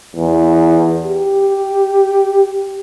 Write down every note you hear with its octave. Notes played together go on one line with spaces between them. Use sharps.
E2
G4